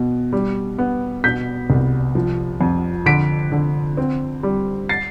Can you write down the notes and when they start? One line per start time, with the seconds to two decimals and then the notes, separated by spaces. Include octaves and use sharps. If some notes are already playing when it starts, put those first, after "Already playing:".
Already playing: B2
0.33 G3
0.78 B3
1.24 B2 G6 B6
1.70 C2
2.15 F3
2.61 F2
3.06 D3 B6 D7
3.52 D3
3.97 C4
4.43 G3
4.89 A6 C7